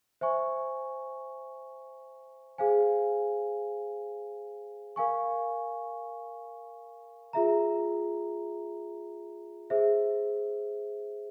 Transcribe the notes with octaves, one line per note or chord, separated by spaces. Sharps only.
C5 E5 G#5 C#6
G#4 C5 F5 G#5
A#4 F5 G#5 C#6
F4 G#4 E5 A#5
G#4 C5 E5